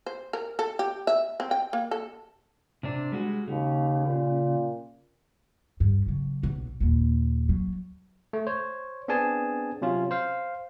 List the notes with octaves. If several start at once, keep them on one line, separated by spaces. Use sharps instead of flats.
C5
A#4
A4
G4
E5
C4
G5
A#3
A4
C3 C4 D4
G3 G#3 F#4
D#2 C#3
A#2
G2
C#3 F#3
B1
D#2 A#2
F#3
A3
C5 C#5
B3 C4 D4 G#4 G#5 A5
C3 F#3 C#4 F4
C5 F5